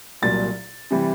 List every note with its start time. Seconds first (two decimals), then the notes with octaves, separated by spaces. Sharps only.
0.22 C2 A#2 F#3 A6
0.91 C3 E3 G3